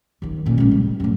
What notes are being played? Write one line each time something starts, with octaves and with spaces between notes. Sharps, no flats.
D#2 D#3
A1 A#2
C#2 G#3
G3
F#2 A2